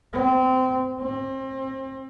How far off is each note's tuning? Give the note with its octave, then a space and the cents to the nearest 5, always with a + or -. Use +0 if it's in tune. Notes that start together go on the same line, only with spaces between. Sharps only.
C4 -25
C4 +35